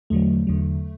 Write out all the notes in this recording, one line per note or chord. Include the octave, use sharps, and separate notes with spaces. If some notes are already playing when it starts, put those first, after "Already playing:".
E2 D3 F#3 A3
E2 D3 F#3